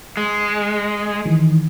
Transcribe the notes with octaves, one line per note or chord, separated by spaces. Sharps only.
G#3
D#3 E3